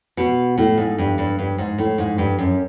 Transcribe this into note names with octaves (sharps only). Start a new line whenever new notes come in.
B2
A2
G#2
G2
G2
G2
G#2
A2
G#2
G2
F#2